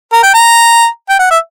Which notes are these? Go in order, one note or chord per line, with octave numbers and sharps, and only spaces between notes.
A#4
G5
A#5
G5
F#5
E5